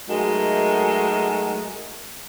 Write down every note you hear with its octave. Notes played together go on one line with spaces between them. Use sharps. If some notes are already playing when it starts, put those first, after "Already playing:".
F#3 G#3 A3 D#4 F#4 A#4